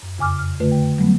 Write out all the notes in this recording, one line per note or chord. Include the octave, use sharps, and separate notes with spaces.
F#2
F2 C#3 G#5 D6 F6
F6
D3 A3 F4 B4
G5
F#3 G3 A3 B3